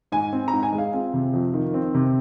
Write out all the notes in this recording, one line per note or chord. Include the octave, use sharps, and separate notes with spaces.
G#2 G#5
C4
A#5
G#2
G#5
G#3
F5
C4 F4
C3
F2
D#3
C4
C3